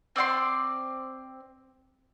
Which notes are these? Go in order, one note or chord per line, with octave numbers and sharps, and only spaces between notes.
C4 D5 F#5 C6